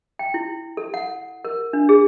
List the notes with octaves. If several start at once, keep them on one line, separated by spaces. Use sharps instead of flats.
G5
E4
A4
F#5
A#4
D4
G#4